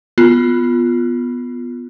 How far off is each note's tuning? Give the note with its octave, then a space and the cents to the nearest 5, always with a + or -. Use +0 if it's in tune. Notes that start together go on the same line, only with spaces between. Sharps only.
B3 +0 F4 +0